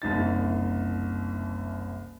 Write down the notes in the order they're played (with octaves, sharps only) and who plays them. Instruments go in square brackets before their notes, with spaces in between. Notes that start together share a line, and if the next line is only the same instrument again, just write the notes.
[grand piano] F#1 C2 D#4 A6